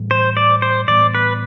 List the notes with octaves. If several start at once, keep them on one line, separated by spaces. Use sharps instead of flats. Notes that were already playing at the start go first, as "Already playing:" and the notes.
Already playing: A2 E3 G3
C5
D5
C5
A2 E3 G3 B3 D5
B4